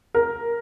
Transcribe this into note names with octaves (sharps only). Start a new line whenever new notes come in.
A#4